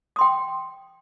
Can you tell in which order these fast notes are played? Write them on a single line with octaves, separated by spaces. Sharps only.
D#6 C6 G5